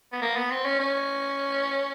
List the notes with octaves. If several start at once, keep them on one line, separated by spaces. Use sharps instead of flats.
B3
A#3
B3
C4
C#4
C#4